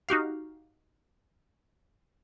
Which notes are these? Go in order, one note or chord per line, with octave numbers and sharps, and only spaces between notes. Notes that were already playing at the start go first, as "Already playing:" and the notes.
D#4 F#4 G4 F5